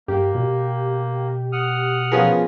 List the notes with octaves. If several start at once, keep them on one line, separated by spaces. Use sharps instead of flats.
G2 A#3 G4
B2
F#5 D#6 F6
F3 B3 C#4 F4 G#4 A#4